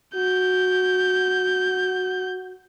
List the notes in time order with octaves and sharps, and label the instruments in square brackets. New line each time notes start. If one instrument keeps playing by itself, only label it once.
[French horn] F#4 [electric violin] G6